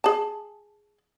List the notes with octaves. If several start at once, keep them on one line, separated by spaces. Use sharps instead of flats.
G#4 A5